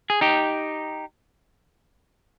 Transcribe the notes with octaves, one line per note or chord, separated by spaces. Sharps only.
G#4
D#4 G4